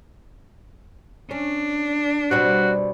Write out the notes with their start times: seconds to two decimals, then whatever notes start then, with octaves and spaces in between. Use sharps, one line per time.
1.31 C#4 D4
2.31 B2 G3 C4 F#4